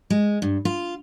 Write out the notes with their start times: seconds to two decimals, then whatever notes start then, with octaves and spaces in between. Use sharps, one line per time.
0.10 G#3
0.42 G2
0.65 F4